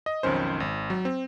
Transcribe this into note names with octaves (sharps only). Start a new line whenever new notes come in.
D#5
B1 F2 D#3 C#4 C5
G#1
F#3
C4